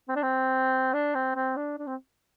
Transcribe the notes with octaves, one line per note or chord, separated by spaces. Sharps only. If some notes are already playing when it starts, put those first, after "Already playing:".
C4
D4
C4
D4
C4
C4
D4
D4
C4